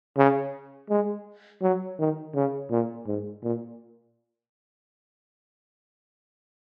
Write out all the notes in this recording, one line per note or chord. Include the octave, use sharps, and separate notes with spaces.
C#3
G#3
F#3
D#3
C#3
A#2
G#2
A#2